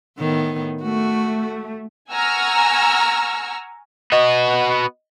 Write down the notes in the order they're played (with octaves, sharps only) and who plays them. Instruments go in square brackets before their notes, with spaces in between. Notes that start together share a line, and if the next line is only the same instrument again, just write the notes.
[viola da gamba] A2 D#3 B3
[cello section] A3 [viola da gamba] F#4
[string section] F#5 G#5 A#5 C#6 E6 F6
[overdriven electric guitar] B3 F#4 [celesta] D#5